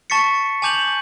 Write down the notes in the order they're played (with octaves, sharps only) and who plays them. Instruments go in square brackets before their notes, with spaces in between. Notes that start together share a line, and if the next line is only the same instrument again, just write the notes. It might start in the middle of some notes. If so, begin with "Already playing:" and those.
[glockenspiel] A5 C#6 A6 B6 C#7
G#5 A5 D6 G6 F7 F#7